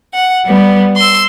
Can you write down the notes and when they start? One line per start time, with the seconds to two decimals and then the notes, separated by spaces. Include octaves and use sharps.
0.14 F#5
0.45 G3 B3
0.96 C6 E6